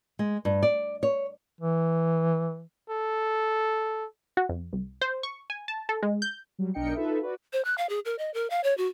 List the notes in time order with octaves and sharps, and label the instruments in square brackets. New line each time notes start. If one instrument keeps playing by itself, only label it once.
[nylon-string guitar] G#3
G2
D5
C#5
[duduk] E3
[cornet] A4
[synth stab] F#4
F2
C2
C5
C#6
G#5
A5
A4
G#3
G6
[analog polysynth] F#3 G3
B1 D4 A#4 D#5 G5 C#7
D#4 F4 A4 B4 E5
F#4 B4 D5
[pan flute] C5
F#6
F5
G#4
A#4
D#5
A#4
F5
C#5
F#4